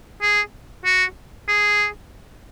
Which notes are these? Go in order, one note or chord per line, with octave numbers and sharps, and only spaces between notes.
G#4
F#4
G#4